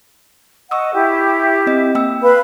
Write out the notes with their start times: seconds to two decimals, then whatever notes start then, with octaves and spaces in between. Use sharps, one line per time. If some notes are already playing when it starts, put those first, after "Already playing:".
0.71 D#5 F#5 C#6 D#6 E6
0.94 E4 G4
1.67 C4 D#5
1.95 A#3 G5 E6
2.23 B4 F5 B5